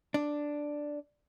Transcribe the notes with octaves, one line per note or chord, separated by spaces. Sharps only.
D4